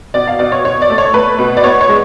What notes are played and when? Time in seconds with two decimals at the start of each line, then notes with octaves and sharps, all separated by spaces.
0.14 B2 D5
0.27 F5
0.39 B2 D5
0.52 C#5
0.65 B2 C#5
0.82 D5
0.90 A3
0.98 C#5
1.14 A3 B4
1.39 B2
1.57 D5
1.64 B3 C#5
1.81 C#5
1.89 G#3